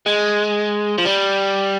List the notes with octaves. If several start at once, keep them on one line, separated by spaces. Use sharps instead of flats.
G#3
F3
G3